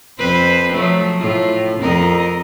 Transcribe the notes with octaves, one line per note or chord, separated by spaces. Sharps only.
F2 B4 C5
F3 F#3 A3
A2 F4
F2 A#4 D#5